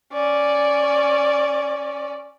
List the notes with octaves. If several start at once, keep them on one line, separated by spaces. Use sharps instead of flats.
C#4 D5